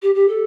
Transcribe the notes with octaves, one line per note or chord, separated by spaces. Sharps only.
G4
G4
A4